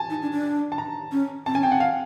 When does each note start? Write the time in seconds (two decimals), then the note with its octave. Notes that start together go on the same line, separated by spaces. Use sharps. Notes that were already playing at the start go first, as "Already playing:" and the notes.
Already playing: G#5 A5
0.10 D#4
0.22 D4
0.33 D4
0.72 A5
0.78 A#5
1.12 C#4
1.46 C4 A5
1.55 C#4 G#5
1.63 C4 G5
1.72 F#5
1.80 F5